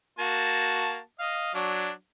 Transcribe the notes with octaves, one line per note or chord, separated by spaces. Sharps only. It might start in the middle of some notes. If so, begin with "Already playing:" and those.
A#3 F#4 A5
D#5 F5
F#3 D4